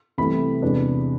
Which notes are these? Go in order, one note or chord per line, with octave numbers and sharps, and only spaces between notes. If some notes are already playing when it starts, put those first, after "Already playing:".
C2 C3 E3 A3 B5
E2 C3 G#3 D4